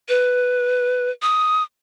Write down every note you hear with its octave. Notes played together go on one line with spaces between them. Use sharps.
B4
D#6